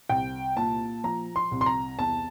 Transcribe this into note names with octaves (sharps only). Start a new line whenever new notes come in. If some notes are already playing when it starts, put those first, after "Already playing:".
C2 G5
A#2 A5
F3 A#5
C6
C2
C6
A#5
E2 A5